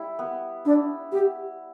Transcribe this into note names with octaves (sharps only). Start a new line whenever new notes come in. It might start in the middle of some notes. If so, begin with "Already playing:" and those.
Already playing: G3 E4
B3
D4 E4
B3 G4